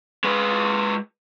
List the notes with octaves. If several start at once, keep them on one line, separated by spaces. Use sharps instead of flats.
G#3 B4